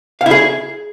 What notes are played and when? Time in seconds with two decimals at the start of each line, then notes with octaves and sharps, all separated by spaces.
0.21 F5
0.26 E4
0.31 G#4